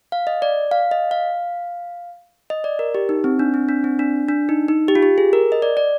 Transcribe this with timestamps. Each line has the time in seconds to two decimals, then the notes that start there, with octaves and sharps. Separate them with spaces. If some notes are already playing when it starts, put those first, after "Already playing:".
0.12 F5
0.27 D#5
0.42 D5
0.71 F5
0.91 D#5
1.11 F5
2.50 D#5
2.64 D5
2.79 A#4
2.95 G4
3.09 D#4
3.24 C4
3.39 D4
3.54 C4
3.69 D4
3.84 C4
3.99 D4
4.29 D4
4.49 D#4
4.68 D#4
4.88 G4
4.95 F4
5.03 G4
5.18 G#4
5.33 A#4
5.52 D#5
5.62 D5
5.77 D5